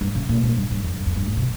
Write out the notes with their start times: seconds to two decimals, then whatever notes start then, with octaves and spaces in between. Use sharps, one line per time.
0.01 G2
0.15 C#3
0.29 A#2
0.43 G#2
0.57 G2
0.71 G2
0.84 F2
0.96 G2
1.06 F2
1.16 G2
1.26 G#2
1.37 C3